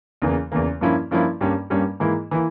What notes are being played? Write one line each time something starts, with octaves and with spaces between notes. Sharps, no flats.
E2 C#3 E3 A#3
E2 C#3 E3 A#3
G2 F3 A#3 C#4 E4
G2 F3 A#3 C#4 E4
G2 G3 A#3 C#4
G2 G3 A#3 C#4
G#2 E3 A#3 E4
E3 A#3 E4